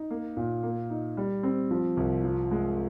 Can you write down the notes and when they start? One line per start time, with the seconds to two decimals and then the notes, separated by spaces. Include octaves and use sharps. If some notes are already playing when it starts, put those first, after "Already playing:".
Already playing: D#4
0.11 A#3
0.37 A#2
0.63 A#3
0.90 D#4
1.17 G3
1.43 C4
1.71 F3
1.97 C2
2.24 F3
2.51 G#3